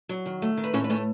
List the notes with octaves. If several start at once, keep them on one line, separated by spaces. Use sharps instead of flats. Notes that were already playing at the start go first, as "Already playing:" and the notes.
F#3
D#3
A3
D#3
B4
A2 C#4 C#5
B4
A3 C#4 C#5